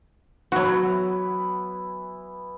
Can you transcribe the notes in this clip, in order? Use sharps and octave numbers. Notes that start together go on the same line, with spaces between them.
E3 F#3 B3 E4 F#4